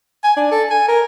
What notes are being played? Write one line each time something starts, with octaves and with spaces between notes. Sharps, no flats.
G#5
D4
A4
G#5
A#4